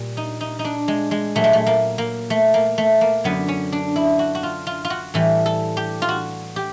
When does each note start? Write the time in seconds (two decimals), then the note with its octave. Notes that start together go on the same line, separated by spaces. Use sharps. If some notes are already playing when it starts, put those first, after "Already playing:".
Already playing: A#2 G3
0.17 D#4
0.41 D#4
0.59 D#4
0.65 D4
0.88 G#3
1.11 G#3
1.35 A#2 F#3 A3
1.44 G#3
1.53 A3
1.67 A#3
1.98 A#3
2.30 A3
2.54 A#3
2.78 A3
3.01 A#3
3.24 F#2 D3 F#3 B3
3.48 C#4
3.72 D4
3.96 E4
4.19 F#4
4.35 F#4
4.43 F4
4.67 F4
4.85 F4
4.90 F#4
5.14 A2 E3 G3 A4
5.46 A4
5.77 G4
6.02 F4
6.09 F#4
6.56 G4